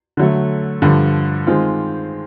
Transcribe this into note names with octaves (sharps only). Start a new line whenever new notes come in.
D3 F#3 A3
G2 D3 F3
D#3 G#3 C4 F4